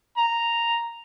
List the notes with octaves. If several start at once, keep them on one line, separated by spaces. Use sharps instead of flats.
A#5